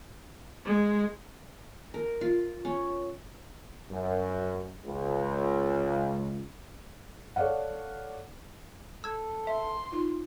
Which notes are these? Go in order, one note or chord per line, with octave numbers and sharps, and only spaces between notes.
G#3
A#4
F4
C#4
F#2
C#2
A4 C#5 D5 F5 F#5
A4 E6 G#6
E5 C6
D#4 F4